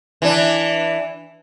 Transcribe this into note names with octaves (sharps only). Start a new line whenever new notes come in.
E3 D4